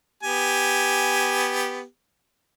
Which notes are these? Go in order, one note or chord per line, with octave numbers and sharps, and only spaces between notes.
B3 G4 G#5